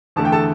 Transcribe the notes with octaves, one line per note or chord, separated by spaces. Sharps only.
E2 D3 A3 A5
G5
A4 A5